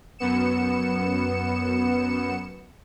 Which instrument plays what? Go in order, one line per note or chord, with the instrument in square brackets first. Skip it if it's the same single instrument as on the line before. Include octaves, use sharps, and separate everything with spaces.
[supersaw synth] F#2 B3 C#7 E7